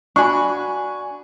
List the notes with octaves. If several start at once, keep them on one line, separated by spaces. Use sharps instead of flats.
D4 F#4 G#5 B5 C#6